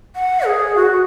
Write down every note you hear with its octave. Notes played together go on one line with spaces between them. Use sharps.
F#5
G#4
F#4